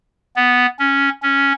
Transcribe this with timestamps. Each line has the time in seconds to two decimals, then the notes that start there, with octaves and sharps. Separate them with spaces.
0.36 B3
0.79 C#4
1.22 C#4